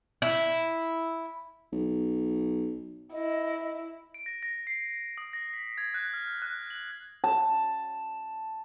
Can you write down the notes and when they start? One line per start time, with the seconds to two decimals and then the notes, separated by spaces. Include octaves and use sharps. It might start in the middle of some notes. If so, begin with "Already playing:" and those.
0.22 E4
1.72 B1
3.13 E4 D#5
4.14 D7
4.26 A#6
4.43 A#6
4.67 C7
5.18 D#6
5.33 A#6
5.54 B6
5.78 G#6
5.94 F#6
6.14 F6
6.42 F#6
6.70 F#7
7.24 A5